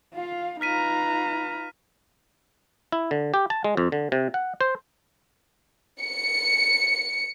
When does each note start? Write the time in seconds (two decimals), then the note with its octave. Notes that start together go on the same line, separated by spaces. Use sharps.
0.14 F4 F5
0.61 D#4 F4 B4 A#5 F6 B6 D#7
2.92 E4
3.11 D3
3.34 G4
3.50 A5
3.64 G#3
3.77 F2
3.92 D3
4.12 C3
4.34 F#5
4.61 C5
6.02 C#7